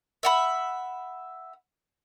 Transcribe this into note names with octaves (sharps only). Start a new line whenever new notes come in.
E5 F#5 B5